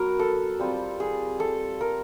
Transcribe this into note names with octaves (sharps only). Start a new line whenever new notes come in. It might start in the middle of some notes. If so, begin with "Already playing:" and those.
Already playing: F#3 B3 A#4
A4
G3 C4 F4
G#4
A4
A#4